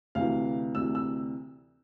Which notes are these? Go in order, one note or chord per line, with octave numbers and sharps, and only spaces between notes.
D2 C3 E3 F5
D2 C3 E3 E6
E6